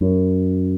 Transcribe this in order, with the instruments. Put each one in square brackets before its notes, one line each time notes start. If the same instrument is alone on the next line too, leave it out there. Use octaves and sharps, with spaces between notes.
[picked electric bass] F#2